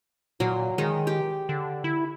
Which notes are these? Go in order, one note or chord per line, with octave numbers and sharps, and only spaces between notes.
A#2 F#3
D#3 G#3
G4
D3
E4